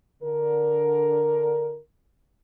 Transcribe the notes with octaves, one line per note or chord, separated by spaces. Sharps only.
D3 A#4